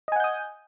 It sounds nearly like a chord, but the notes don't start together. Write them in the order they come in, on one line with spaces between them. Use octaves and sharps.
D#5 G#5 F#5 G6 D#6